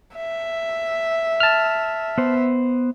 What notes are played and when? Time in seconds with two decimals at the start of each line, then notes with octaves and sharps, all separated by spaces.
0.16 E5
1.40 A5 F6
2.18 B3 C5